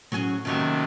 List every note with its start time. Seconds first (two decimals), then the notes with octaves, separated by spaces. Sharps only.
0.12 A2 F#3 C#4 G#4
0.45 D#2 C3 D#3 F#3 A3 C#4